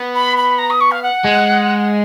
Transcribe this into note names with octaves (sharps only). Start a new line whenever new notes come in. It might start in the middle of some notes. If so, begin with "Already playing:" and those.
Already playing: B3
B5
B5
A#5
D#6
C#6
F5
F#5
G#3